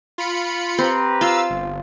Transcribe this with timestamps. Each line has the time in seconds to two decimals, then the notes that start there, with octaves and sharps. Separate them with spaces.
0.18 F4 B5 C#7
0.78 C4 G4 B4 A#5
1.21 F4 F5 E6
1.50 G1